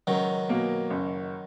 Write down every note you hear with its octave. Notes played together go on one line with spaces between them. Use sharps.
C#2 D#3 F#3
B2 A#3
F#1